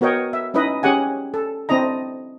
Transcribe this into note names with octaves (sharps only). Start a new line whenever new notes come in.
B3 F#4 A#4 C#5 D#5 G5
E5
C#4 D#4 E4 B4 D#5
C#4 G4 G#4 F#5 G#5
A4
C4 D4 E4 D#5 A#5